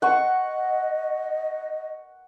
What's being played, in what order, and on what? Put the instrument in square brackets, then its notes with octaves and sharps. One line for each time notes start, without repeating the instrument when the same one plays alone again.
[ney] D#5 [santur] F#5 C#6